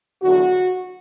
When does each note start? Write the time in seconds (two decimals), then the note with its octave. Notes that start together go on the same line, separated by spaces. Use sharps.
0.22 E2 D3 F#3 F#4